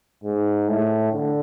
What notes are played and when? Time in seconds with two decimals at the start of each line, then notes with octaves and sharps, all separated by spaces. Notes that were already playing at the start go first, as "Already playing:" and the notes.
0.24 G#2
0.68 A2
1.12 D3